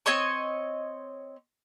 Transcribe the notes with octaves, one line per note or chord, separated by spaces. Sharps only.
C4 C#5 D#5 C#6